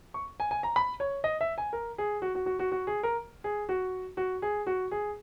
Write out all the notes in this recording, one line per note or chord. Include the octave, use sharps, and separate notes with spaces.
C#6
G#5
G#5
A#5
B5
C#5
D#5
E5
G#5
A#4
G#4
F#4
F#4
F#4
F#4
F#4
G#4
A#4
G#4
F#4
F#4
G#4
F#4
G#4